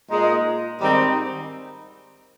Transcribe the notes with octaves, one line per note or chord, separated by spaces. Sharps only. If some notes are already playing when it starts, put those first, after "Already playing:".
A#2 G#3 D#4
G#2 D#3 G3 C4 D#4